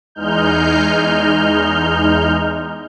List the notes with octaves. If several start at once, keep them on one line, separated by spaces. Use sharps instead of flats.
E2 G#3 D#4 F6 G6